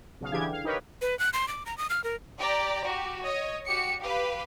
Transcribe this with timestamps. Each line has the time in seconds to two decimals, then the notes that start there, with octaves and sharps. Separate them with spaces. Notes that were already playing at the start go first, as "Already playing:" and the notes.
0.21 B1 C#3 F5
0.32 D3 E3 D4 G4 G#4 G#6
0.53 F5
0.64 D#4 G4 A#4 B4 C#5
1.01 B4
1.19 F#6
1.33 C6
1.48 D6
1.66 A#5
1.78 D#6
1.90 F6
2.04 A#4
2.40 G4 D5 G5 A#5
2.86 F#4 G4
3.25 C#5 D#5
3.68 F#4 G4 C#7
4.02 G4 B4 F5